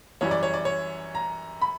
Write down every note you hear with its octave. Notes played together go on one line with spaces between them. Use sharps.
F#2 E3 G3 C#5
D5
C#5
D5
C#5
A#5
B5